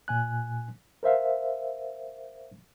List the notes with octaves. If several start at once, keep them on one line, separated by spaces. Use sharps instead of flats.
A#2 G#5 F#6
A#4 C5 E5 F5